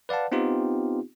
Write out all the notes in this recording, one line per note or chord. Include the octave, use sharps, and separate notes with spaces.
B4 D5 F5 F#5 A5
B3 C4 D#4 F4 G4